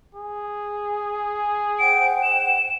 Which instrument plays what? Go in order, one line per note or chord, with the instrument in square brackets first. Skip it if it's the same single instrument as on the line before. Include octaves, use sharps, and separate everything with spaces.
[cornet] G#4
[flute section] C5 F#5 G5 [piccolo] D7
[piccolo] E7